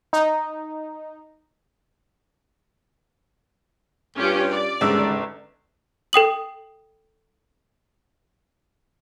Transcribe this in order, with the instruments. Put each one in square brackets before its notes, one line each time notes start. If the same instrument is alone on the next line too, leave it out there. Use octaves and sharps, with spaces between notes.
[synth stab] D#4
[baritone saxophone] G2 [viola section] C#4 F4 G4
[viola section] D5
[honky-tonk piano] G1 E6 [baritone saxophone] D#2 [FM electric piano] G#2 C#3
[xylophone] A4 G5 D#6 F#7